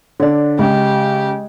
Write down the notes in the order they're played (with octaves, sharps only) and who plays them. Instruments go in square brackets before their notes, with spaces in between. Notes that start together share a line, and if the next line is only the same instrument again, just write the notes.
[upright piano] D3 D4 [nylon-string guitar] C#5 D5
[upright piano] C#3 [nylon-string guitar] G#3 [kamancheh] G4